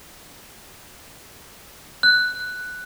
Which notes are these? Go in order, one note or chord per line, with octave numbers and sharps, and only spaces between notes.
F#6